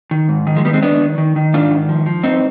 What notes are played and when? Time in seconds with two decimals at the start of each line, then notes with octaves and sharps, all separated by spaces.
0.11 D#3
0.29 G#2
0.47 D#3
0.56 F3 G#3
0.65 D#3 G3 B3
0.73 G#3 C4
0.82 D#3 B3 D4
1.00 D#3
1.18 D#3
1.36 D#3
1.53 G#2 D4 F4
1.71 D#3
1.89 F3
2.06 F3
2.23 G2 C4 D#4